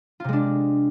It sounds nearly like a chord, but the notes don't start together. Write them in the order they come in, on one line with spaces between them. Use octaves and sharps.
F4 C3 G#3 D4